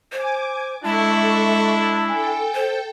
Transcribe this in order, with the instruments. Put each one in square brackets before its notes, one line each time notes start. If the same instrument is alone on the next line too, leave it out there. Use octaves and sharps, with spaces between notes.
[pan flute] C5 [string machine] G#5 D6
[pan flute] G#3 [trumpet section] D4 E4 [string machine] A4 E5 C#6 [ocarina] A5
[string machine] A4 G5 [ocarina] G#5
[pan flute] C5